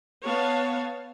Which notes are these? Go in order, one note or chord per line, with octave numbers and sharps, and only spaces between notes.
B3 C#5 F5 A5